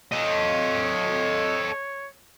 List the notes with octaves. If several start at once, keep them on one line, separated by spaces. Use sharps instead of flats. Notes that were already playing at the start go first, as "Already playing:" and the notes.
A4 C#5 D#5